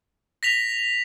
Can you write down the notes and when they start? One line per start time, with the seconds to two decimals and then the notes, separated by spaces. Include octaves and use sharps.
0.43 A#6 B6 F7